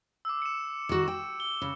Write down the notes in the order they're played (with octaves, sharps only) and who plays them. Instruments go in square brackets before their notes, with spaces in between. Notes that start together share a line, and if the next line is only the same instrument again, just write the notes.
[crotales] D6 E6
C#7 E7
[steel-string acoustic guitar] D#3 F#4
G5
[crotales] G7
[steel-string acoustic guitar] C#3